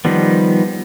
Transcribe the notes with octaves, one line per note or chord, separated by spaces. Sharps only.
D#3 F3 G3 B3